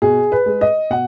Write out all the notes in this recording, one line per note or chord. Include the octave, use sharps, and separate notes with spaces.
B2 G#4
B4
G#3
D#5
B2 F#5